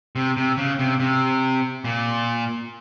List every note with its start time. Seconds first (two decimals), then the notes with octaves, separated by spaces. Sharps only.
0.16 C3
0.37 C3
0.57 C#3
0.79 C3
1.00 C3
1.84 A#2